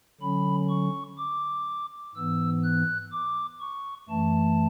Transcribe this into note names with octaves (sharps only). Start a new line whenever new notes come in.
D3 F#3 C#4 B5
C#6
D6
G#2 E3 B3 E6
F#6
D6
C#6
F#2 E3 A3 A5